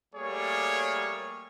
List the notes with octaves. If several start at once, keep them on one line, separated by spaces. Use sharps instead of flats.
G3 A3 A#3 G#4 C#5